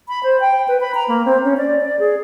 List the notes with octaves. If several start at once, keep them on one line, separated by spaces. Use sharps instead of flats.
B5
C5
G5
B4
B5
A#5
A#3
C4
C#4
D5
D5
G#4